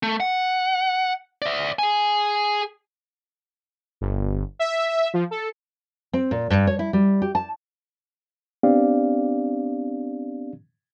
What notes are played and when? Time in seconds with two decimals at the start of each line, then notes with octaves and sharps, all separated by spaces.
0.03 A3
0.20 F#5
1.42 D5 E5
1.79 G#4 G#5
4.01 G1
4.59 E5
5.14 F3
5.31 A4
6.13 C4
6.31 A#2
6.50 G2
6.67 C#5
6.79 E4
6.93 G3
7.22 G4
7.35 A5
8.63 B3 C4 D4 G4 D5 F5